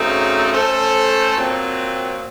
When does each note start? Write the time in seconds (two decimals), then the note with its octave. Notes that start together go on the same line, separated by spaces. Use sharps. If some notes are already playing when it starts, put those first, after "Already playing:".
Already playing: F#2 C#3 A3 C4 D#4
0.53 A3 C#4 A4 C5
1.36 A#2 F#3 C4